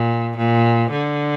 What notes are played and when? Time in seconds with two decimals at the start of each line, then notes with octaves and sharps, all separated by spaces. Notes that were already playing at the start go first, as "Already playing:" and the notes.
Already playing: A#2
0.38 A#2
0.91 D3